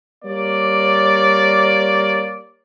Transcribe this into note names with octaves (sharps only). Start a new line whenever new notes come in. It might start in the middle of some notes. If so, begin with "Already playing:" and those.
G3 A#3 C#5 D5